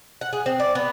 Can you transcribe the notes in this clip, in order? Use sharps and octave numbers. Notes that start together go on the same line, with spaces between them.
F#5
G#4
C4
D5
B3